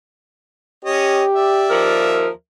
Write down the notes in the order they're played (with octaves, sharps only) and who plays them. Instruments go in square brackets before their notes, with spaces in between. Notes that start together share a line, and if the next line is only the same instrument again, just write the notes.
[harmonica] C#4 C#5 D#5 [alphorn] G4
[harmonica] D5 E5
[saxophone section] D#2 F3 A#4